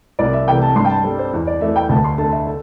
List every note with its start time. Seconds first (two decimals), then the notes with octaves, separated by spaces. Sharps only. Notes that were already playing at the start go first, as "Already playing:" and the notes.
0.19 C2 D5
0.33 E5
0.47 C3 E3 A3 G5
0.62 A5
0.76 G2 C6
0.85 G5
0.90 A5
1.04 G3 A4
1.19 C5
1.33 E2
1.47 D5
1.61 E3 A3 E5
1.76 G5
1.89 D2 A5
2.04 C6
2.18 D3 A3 A5
2.32 E5
2.47 A4